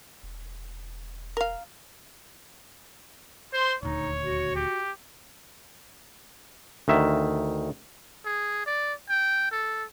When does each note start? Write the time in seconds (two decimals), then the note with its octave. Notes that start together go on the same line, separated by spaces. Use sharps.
0.23 E1
1.37 A#4 F5
3.53 C5 C6
3.83 D#1 D2 D#4 C#5
4.24 F#4
4.56 G4
6.88 D2 D#3 E5
8.25 G#4
8.66 D5
9.09 G5
9.51 A4